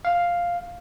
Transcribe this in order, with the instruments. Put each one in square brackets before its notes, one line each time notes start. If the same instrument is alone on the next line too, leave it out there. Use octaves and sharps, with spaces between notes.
[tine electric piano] F5